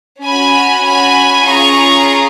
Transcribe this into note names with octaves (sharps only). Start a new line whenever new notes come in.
C#4 F#4 G#5 B5
G#5 B5
C#4 F4 G#4 A#5 C#6